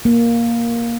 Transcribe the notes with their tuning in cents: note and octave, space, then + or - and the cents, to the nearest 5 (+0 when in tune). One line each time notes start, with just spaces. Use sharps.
A#3 +5